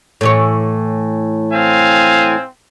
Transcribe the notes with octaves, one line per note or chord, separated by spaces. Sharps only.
A2 E3 C#5
C4 F5 G#5